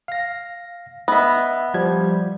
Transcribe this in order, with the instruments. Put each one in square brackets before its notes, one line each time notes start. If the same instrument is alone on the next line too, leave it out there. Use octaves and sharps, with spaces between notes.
[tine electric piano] F5 A#6
[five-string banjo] B3 [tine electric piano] D#5 E5
[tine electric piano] F3 G3 G#6